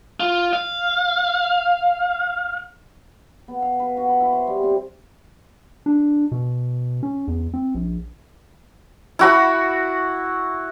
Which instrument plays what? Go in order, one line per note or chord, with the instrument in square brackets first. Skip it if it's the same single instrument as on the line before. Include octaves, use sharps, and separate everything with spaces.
[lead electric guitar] F4
F5
[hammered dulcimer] B3
F5
B4
F#4
B5
E4
C5
G3
C4
[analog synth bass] D4
B2
C#4
E2
C4
A#1
[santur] E4 F#4 B5